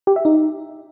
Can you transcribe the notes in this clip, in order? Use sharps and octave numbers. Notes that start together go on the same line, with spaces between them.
G4
E5
D#4